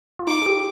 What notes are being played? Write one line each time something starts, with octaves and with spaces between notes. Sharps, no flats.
F4
D#4 D6
G#4
G4